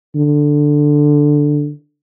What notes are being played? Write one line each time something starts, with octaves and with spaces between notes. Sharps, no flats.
D3